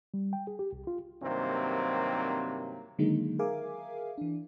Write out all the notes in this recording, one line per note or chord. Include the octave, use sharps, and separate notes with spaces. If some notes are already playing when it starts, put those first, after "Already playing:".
G3
G5
G#4
G4
C2
F4
G2 C3 D#3 F#3 A#3 C4
D3 D#3 F#3 G#3 A#3 D#4
G#4 A#4 E5 F5 G#5 D6
E3 D4